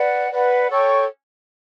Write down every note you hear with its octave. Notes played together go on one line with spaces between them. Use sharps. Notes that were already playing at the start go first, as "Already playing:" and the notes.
Already playing: B4 D5 F#5
B4 D5 F#5
A4 C#5 G5 C#6